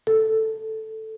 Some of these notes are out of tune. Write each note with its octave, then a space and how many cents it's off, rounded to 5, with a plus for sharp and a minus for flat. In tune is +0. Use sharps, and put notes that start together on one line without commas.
A4 +0